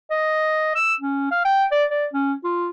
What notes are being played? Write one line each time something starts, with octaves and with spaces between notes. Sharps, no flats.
D#5
E6
C#4
F5
G5
D5
D5
C#4
F4